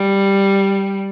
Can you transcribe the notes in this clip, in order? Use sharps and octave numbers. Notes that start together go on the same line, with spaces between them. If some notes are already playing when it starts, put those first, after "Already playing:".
Already playing: G3